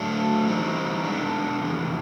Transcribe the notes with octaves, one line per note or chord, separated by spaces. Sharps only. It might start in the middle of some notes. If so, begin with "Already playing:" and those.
Already playing: A2 F#3 A3 D4
E3 G3 C4 D#4
G#3 B3 D4
F2 C3 E3